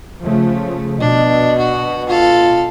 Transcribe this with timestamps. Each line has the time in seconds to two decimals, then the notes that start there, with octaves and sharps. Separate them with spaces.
0.23 C#3 F3 A3
1.00 B2 D4 D#5
1.58 F#4
2.08 F4 A4 F5